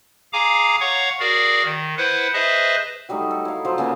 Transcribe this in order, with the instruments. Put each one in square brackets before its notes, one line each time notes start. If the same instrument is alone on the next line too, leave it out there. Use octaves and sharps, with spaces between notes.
[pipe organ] G#4 F5 G#5 A#5 D6
C#5 F5 F#5 A#5 C#6
F#4 G#4 A#4 D5 F5
D#3
E4 B4 C5 F#5
G#4 B4 C5 D#5 E5 A5
[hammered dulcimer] F#3 G3 A3 D#4
A4
E4 F5
F3 F#3 F4 C5
C#3 A#3 B3